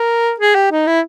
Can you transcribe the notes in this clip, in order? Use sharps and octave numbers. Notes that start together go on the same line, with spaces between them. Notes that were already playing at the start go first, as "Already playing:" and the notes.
Already playing: A#4
G#4
G4
D#4
E4